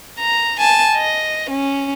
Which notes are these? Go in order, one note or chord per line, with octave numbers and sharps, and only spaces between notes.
A#5
G#5 A5
D#5
C#4